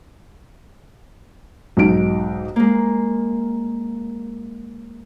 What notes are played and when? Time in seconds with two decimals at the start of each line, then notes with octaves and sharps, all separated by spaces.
1.77 B1 G#2 D#4 D7
2.56 G#3 A#3